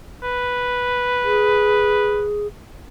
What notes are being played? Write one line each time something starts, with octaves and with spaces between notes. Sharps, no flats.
B4
G#4